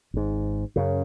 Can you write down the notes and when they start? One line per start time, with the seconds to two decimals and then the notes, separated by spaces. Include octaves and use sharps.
0.14 G#1 G#2
0.76 F#2 C#3